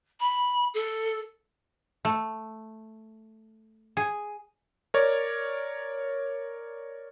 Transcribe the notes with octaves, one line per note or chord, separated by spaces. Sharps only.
B5
A4
A3
G#4
A#4 C#5 D5